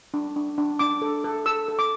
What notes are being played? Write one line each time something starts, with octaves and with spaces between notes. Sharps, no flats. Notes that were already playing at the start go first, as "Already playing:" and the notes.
D4
D4
D4
D4 D6
A4
A4
A4 E6
A4
D6